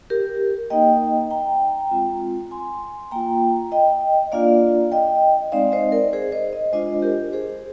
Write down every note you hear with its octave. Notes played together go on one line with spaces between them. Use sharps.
G4 A#4
A#3 D#4 D#5 G5
G5 A#5
G#3 C4 F4
G#5 C6
A#3 F4 G5 A#5
D#5 G5
A#3 D4 F4 D5 F5
D#5 G5
G#3 C4 D#4 D5 F5
C5 D#5
A#4 D5
G#4 C5
C5 D#5
C5 D#5
G#3 D4 F4 C5 D#5
G4 A#4
G#4 C5